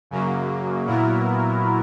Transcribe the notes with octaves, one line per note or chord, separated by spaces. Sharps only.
F#2 C#3 F#3 A#3
A#2 F#3 B3 E4 A#4